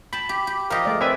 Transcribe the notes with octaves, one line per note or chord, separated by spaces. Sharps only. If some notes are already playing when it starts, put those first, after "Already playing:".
G5 A5 B5
G4
G4
F3 G4 A#4 D#5 F5
G#3 A3 D5
C4 B4 D5 E5 G#5